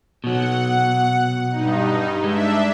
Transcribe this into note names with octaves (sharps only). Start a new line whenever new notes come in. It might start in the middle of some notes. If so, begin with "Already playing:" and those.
B2 F#3 F#5
G2 D#4
G#3 D4 E5